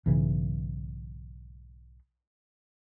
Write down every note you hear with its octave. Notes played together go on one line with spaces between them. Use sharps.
B1 G#2 C#3 E3